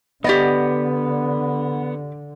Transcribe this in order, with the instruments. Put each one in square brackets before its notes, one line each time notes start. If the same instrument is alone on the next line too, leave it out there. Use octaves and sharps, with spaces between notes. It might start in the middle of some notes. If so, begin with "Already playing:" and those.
[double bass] D3 [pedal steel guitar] B3 [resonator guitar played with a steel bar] G4 D5 D#5